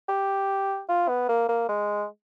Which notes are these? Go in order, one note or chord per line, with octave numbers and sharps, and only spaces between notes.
G4
F4
B3
A#3
A#3
G#3